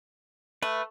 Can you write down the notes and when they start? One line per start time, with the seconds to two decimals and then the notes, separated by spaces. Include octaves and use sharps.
0.62 A3 B4